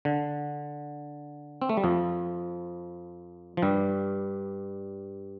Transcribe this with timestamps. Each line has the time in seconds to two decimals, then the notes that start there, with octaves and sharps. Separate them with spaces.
0.05 D3
1.62 C4
1.69 A3
1.77 G3
1.84 F2 F3
3.57 F3
3.62 G2 G3